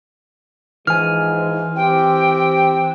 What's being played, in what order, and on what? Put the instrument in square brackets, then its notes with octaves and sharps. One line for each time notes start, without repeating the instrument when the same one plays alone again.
[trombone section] G#2 F3 G#3 [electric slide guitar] E3 [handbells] G#5 F6
[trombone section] C4 G4 [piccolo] G5